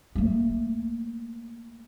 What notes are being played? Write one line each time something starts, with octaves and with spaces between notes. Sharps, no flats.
A3 A#3